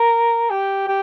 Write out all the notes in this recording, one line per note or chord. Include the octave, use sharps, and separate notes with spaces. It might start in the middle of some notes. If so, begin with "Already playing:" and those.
Already playing: A#4
G4
G4